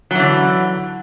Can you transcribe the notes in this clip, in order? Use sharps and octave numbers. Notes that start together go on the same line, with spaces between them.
D3 E3 F#3